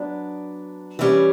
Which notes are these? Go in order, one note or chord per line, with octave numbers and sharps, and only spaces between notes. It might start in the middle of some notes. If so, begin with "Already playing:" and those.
Already playing: F#3 B3 D4
E3 G3 C#4